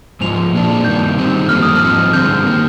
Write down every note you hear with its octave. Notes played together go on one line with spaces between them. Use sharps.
G#2 F3 G#3 F7
A#2 G#3 D4
G2 D#3 A#3 G6
D#3 G3 C4 D#4
F2 D3 G3 A#3 F6
D#6
F6
G#2 F3 C4 D#4
G2 D3 G#3 C4 G6
D#3 A#3